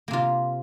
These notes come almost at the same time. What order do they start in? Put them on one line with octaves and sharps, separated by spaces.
A#3 C3 F4